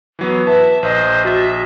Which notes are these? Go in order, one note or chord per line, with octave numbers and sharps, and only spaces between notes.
E3 F#3 B3
B4 E5 A5
A#1 C5 D#5
F#4 E5 A6